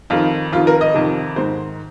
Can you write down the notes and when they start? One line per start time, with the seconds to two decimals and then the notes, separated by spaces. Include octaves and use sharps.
0.10 F2 D#3 F4
0.52 F2 F4
0.56 D#3
0.67 A#4
0.81 D#5
0.94 F2 C3 D#3
1.36 G#2 D#3 C5